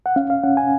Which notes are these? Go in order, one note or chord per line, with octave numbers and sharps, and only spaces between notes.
F#5
C#4 F5
F5
C#4 F#5
G#5